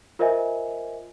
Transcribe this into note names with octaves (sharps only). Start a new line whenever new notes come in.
F4 A#4 C5 D#5 E5 G#5